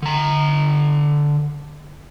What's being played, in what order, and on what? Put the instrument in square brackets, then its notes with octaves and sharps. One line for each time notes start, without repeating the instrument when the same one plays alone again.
[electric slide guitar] D3 A#5